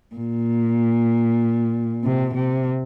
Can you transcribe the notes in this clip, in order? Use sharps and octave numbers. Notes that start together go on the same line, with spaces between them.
A#2
C3
C3